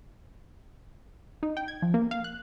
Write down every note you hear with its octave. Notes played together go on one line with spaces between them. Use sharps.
D#4
G5
G#6
F3
A#3
F5
F#6